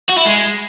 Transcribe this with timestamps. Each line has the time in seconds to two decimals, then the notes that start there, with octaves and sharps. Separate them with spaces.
0.09 F#4
0.17 E4
0.25 G#3